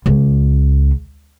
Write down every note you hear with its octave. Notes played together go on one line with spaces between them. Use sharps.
C#2